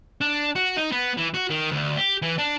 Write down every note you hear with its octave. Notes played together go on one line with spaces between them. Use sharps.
D4
F#4
D#4
B3
E3
F#4
D#3
D2
G4
E3
D4